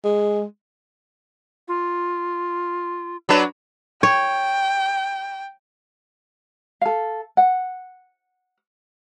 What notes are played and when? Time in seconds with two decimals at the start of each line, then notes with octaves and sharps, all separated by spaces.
0.04 G#3
1.68 F4
3.29 F#3 D4 B4
4.03 C#5 G5
6.81 A4 F5
7.37 F#5